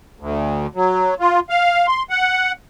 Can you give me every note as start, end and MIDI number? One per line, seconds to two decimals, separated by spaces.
0.20 0.67 38
0.75 1.14 54
1.20 1.40 65
1.50 1.87 77
1.88 2.03 84
2.10 2.52 78